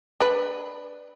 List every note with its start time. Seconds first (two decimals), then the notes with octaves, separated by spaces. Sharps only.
0.20 D4 B4